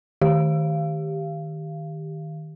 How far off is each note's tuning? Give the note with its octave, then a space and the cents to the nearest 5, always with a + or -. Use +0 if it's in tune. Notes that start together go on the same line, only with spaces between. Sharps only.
D#3 +0 G4 +5 F5 -25